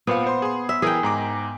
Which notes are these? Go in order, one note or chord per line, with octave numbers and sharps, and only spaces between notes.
A#2 B3 C5 F5
C5 C6
G#4 C6
E5
E3 G#4 A#4 G5
G#2 A#5 D6